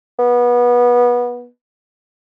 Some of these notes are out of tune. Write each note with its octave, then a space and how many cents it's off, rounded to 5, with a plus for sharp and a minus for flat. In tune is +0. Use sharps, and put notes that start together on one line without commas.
B3 -25